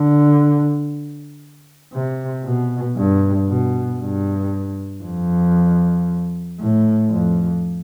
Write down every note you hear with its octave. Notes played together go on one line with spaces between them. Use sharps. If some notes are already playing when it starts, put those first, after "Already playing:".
Already playing: D3
C3
B2
G2
B2
G2
F2
A2
F2